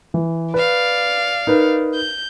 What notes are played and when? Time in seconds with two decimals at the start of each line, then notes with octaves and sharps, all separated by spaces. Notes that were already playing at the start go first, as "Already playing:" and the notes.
0.14 E3
0.54 B4 D5 F5
1.47 D#4 A#4 B4
1.94 G6